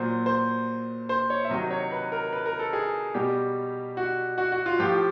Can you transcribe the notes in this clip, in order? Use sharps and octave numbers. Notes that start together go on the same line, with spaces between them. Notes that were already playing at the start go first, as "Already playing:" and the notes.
Already playing: A#2 F#3 C5
C5
C5
C#5
E5
C3 D#3 F#3 D#5
C#5
B4
A#4
B4
A#4
A4
G#4
B2 G3 G4
F#4
F#4
F#4
F4
A2 F3 G4